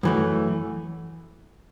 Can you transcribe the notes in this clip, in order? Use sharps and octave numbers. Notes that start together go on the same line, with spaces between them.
F#2 E3 A3